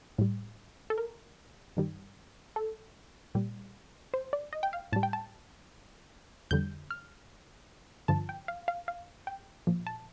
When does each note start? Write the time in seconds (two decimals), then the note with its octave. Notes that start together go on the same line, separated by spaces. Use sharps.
0.18 A2 G3
0.90 A4
0.98 A#4
1.77 G2 D#3 G3
2.56 A4
3.35 A#2 G3
4.14 C5
4.33 D5
4.53 D#5
4.63 G5
4.73 F5
4.92 A2 G3 A5
5.03 G5
5.13 A5
6.51 F2 D3 G3 G6
6.91 F6
8.08 G2 D3 F3 A5
8.29 G5
8.48 F5
8.68 F5
8.88 F5
9.27 G5
9.67 A#2 F3
9.87 A5